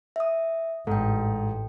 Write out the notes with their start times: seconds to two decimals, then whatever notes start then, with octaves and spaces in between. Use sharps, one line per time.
0.16 E5 D#6
0.87 A1 G#2 A4 G5